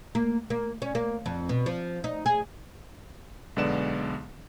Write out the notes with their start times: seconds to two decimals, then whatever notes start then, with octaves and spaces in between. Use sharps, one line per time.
0.15 A#3
0.50 A#3
0.82 C#4
0.95 A#3
1.26 F2
1.49 B2
1.66 F3
2.04 D#4
2.26 G#4
3.56 B1 D3 G#3 B3 D5 E7